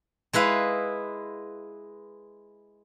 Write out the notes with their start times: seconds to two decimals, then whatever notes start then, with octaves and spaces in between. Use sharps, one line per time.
0.33 G#3 E4 B4 F5